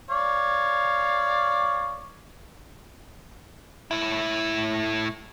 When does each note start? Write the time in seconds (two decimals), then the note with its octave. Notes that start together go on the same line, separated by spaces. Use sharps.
0.10 C#5 D5 F5
3.91 A2 E4